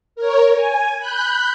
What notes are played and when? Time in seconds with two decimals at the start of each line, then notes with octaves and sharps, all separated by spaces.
0.16 A#4 C#5
0.55 G#5
0.99 B5 F#6 G6